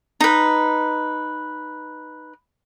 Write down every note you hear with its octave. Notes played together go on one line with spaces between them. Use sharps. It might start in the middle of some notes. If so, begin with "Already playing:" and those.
D#4 B4